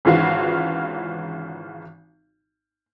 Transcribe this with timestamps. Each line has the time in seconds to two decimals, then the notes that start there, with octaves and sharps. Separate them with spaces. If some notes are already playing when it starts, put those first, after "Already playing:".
0.05 G#1 C#3 E3 F4 F#4 F5